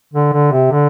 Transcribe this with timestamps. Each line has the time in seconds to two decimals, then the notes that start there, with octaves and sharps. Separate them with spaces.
0.13 D3
0.33 D3
0.52 C3
0.72 D3